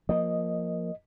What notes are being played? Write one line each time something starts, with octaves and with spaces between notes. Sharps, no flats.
F3 A#3 D#5